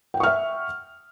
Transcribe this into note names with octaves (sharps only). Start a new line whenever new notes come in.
E5 F#5 G5 C#6 F6